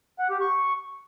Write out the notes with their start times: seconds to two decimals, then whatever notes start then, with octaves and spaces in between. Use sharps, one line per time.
0.19 F#5
0.30 G4
0.41 C#6